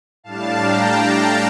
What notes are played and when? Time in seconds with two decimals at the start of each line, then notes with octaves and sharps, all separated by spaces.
0.24 A2 G3 D4 F5 A5
0.59 G5 A#5
0.95 F5 A5